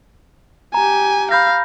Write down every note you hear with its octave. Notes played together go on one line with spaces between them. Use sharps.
G4 G#5 A#5
F5 B5 G6 A#6